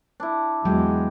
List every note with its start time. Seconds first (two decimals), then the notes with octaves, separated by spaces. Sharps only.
0.20 D4 E4
0.65 E2 F#3 G#3 G4